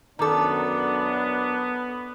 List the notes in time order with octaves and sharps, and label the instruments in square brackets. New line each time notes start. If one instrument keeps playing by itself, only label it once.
[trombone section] F#2 D4 [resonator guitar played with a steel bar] D#3 A4 [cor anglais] B3 [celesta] A#5 D6